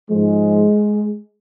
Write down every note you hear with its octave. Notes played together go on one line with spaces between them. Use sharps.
G#2 F3 G#3